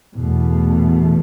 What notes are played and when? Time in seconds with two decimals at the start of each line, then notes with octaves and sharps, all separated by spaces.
0.15 E2 B2 A3